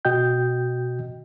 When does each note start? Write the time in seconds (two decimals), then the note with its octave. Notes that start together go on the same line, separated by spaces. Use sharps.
0.05 B2 F#4 D#5 G5 G6